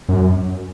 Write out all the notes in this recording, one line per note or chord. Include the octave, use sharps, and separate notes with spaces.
F#2